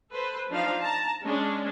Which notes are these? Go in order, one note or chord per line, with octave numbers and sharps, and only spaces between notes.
A4 B4 C5
F3 D4 D#4 F5
A5 A#5
G#3 C#4 D4